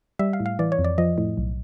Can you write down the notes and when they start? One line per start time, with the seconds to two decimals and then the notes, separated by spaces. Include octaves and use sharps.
0.19 G3 E5
0.33 F5
0.40 A2
0.46 F5
0.59 E3 D5
0.72 C#5
0.79 F2
0.84 D5
0.98 F3 D#5
1.18 A2
1.37 B1